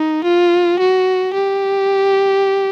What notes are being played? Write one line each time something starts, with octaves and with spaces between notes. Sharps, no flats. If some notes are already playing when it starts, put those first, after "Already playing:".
Already playing: D#4
F4
F#4
G4